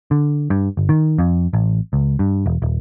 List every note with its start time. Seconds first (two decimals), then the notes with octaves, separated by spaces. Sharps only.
0.11 D3
0.50 G2
0.77 G1
0.89 D#3
1.18 F2
1.53 A1
1.93 C#2
2.19 G2
2.46 E1
2.62 D#1